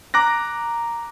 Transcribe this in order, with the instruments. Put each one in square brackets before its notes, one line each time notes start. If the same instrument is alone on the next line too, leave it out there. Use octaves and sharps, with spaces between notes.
[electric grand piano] A#5 D6 F#6 A#6